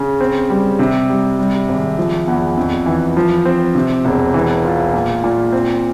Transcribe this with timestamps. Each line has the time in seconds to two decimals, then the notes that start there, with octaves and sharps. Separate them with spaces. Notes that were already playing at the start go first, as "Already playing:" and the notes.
Already playing: C#3
0.21 C4
0.50 G3
0.79 C3
1.09 G3
1.39 G3
1.69 G#1
1.98 F3
2.27 E2
2.57 F2
2.86 E3
3.17 F3
3.45 C4
3.75 C3
4.05 E1
4.34 E3
4.65 F4
4.94 A#2
5.24 A#2
5.53 C4